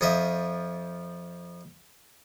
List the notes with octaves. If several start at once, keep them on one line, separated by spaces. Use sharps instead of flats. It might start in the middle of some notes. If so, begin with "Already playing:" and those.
F2 F3 D#5 E5